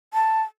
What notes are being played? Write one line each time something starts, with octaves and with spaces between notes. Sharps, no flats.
A5